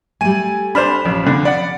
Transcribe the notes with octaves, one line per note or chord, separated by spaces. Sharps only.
G3 A3 G#5 D#7
D4 C5 B5 F6 E7
A1 F3
F2 D3
D5 F#5 B5